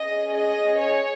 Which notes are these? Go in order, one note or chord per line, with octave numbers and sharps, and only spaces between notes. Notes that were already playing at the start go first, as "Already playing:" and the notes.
Already playing: C#4 G#4 D#5
D#5
C#5